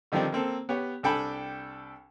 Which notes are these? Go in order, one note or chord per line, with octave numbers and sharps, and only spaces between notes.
D3 D#3 F3 G3 C4 D4
A#3 C4 A4
B3 G4 C#5
C2 D4 A4 G5 G#5 B5